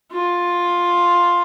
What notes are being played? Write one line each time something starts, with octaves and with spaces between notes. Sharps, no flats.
F4